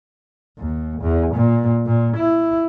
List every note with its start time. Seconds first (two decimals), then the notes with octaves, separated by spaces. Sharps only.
0.58 D#2
1.02 E2
1.34 A#2
1.86 A#2
2.16 E4